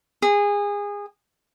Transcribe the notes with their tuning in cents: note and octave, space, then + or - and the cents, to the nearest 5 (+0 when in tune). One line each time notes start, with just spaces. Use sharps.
G#4 -25